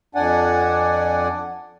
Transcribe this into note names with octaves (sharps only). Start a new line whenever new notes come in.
F2 D4 D5 F#5 G#5